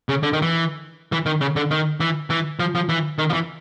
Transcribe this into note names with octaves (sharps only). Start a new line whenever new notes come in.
C#3
D3
D#3
E3
E3
D#3
C#3
D3
D#3
E3
E3
F3
F3
E3
D#3
F3
E3